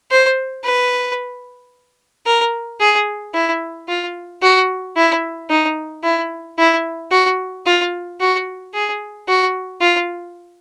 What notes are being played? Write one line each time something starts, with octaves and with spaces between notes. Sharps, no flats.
C5
B4
A#4
G#4
E4
F4
F#4
E4
D#4
E4
E4
F#4
F4
F#4
G#4
F#4
F4